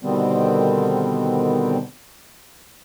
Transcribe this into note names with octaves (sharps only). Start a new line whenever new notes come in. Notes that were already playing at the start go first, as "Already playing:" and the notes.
B2 D3 D#3 G3 B3 C4